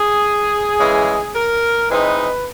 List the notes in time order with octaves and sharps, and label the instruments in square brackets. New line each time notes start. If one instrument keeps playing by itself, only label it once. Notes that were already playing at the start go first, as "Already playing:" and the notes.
Already playing: [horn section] G#4
C#3 E3 G#3
A#4
E3 G#3 C4 D#4 B4